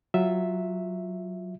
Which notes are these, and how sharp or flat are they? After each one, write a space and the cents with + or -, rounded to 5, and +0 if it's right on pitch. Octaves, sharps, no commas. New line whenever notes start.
F#3 +0 F4 +15 E5 +0